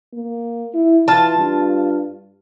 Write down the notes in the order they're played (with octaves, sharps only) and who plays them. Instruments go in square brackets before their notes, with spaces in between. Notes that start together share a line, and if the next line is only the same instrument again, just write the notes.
[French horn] A#3
E4
[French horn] E3 [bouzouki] F4 A5
[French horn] G2